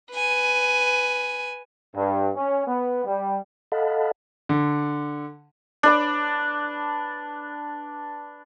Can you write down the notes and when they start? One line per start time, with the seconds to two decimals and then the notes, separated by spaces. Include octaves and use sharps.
0.13 B4 G#5
1.94 G2
2.35 C#4
2.67 B3
3.06 G3
3.72 A4 D#5 F5 F#5 A5 B5
4.49 D3
5.83 D4 B4 D6